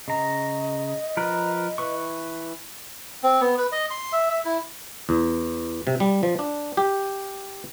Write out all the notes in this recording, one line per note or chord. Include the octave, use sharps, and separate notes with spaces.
C#3 D#5 A#5
F3 A#4 B4
E3 B4 C#6
C4
B3
B4
D#5
C6
E5
E5
E4
E2
C3
G3
F3
D4
G4